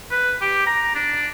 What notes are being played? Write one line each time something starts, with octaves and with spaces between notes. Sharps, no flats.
B4
G4
A#5
D4